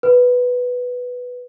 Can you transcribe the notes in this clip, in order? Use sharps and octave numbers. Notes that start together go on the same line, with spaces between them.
B4